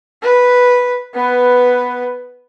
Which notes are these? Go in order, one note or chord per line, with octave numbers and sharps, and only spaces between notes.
B4
B3 B4